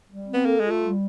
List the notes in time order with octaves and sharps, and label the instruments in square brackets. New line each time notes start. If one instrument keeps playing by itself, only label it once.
[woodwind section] G3
C4
[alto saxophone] B3
[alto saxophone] A#3 [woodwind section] A4
[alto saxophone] G#3 [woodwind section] F4
[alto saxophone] A3
[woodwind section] G3